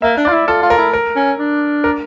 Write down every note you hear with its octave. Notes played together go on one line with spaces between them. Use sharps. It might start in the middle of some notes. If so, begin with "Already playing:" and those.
A#3 E5
D4
D5
F4
E4
F4 A4
F4
A#4
E4
A#4
C#4
D4
A#4